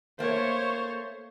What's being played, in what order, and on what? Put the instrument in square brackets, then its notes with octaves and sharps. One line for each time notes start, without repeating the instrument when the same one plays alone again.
[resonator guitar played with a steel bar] A3 A#3 [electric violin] C5 C#5